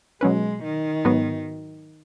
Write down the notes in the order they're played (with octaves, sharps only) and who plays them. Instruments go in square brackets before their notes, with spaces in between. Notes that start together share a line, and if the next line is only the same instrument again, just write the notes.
[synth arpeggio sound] B2 F#3 C#4 B4 [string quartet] G#3
[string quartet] D#3
[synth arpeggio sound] G#2 F#3 B3 F#4 B4